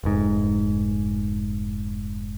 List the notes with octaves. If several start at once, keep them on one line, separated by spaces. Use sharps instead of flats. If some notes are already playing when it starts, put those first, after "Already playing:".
F1 G#2